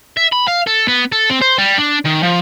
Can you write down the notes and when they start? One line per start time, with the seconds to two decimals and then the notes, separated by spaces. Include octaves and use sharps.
0.17 E5
0.32 B5
0.48 F5
0.67 A4
0.88 B3
1.12 A4
1.30 C4
1.42 C5
1.58 G3
1.78 D4
2.05 D#3
2.23 F3